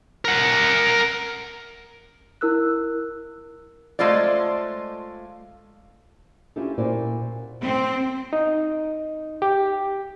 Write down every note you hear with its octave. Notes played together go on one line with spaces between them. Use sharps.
A#4 F#5
E4 A#4 E6 F#6
G#3 A3 F4 C5 D5
C#4 D4 E4 F4 G4 A4
A#2 C#4 E4 F#4 C5 D5
C4
D#4
G4